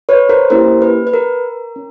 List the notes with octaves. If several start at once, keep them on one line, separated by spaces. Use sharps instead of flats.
B4 C#5
A#4 C5
A#3 C#4 E4 G4 A#4 C5
B4
B4
A#4
C#4